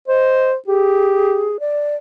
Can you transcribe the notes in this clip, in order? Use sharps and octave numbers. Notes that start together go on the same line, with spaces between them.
C5 D#5
G4 G#4
D5